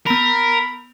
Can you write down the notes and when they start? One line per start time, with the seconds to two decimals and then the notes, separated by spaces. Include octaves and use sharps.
0.06 B3 A#4 B5 F7